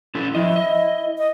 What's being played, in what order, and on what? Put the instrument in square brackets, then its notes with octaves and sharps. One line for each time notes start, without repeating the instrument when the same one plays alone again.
[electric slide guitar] C#4 E4 A4
[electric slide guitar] F3 D#5 [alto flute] E4
[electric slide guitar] D#5
[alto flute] D#5